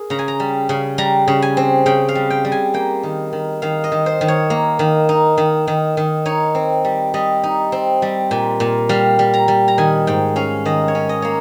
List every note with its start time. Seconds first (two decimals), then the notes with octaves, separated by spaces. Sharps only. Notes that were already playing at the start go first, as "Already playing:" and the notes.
Already playing: G#4 A#4
0.10 C#3 A#5
0.19 G#5
0.28 A#5
0.40 G3
0.69 C#3
0.98 G3 A#5
1.28 C#3
1.42 G#5
1.57 C4
1.86 C#3 G5
2.09 F5
2.15 G3
2.30 G5
2.45 G3
2.52 G#5
2.74 A#3 G5
3.03 D#3
3.33 D#3
3.62 D#3 F5
3.84 D#5
3.92 D#3
4.06 C5
4.21 D#3
4.28 C#5
4.50 A#3
4.79 D#3
5.09 D#4
5.38 D#3
5.67 D#3
5.97 D#3
6.26 D#4 C#5
6.55 C4
6.85 G3
7.14 G3 D#5
7.43 D#4
7.72 C4
8.02 G3
8.31 A#2
8.60 A#2
8.89 G3 F5
9.19 G3
9.34 A#5
9.48 G3
9.68 A#5
9.78 D#3 G#5
10.07 G#2 G5
10.36 C#4 F5
10.65 D#3 D#5
10.88 C#5
10.95 C#4
11.09 D#5
11.22 A#3 C#5